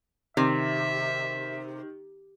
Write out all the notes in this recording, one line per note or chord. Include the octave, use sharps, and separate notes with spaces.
C3 D#3 E5